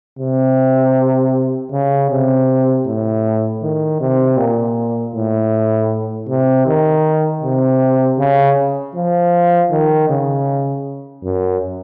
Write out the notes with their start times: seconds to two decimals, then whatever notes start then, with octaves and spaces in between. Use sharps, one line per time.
0.19 C3
1.71 C#3
2.10 C3
2.85 A2
3.62 D#3
4.00 C3
4.37 A#2
5.14 A2
6.28 C3
6.66 D#3
7.43 C3
8.18 C#3
8.95 F3
9.71 D#3
10.10 C#3
11.23 F#2